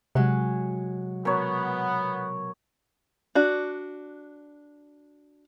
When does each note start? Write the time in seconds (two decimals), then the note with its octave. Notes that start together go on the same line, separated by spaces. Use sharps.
0.15 C3 F#3 G#3 F#5
1.25 B2 B3 A#4 C#5
3.35 D4 F#4